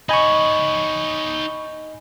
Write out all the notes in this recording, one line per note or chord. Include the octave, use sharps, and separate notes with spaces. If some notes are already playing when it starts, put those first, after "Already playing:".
D#4 C#5 D#5 G#5 B5 C#6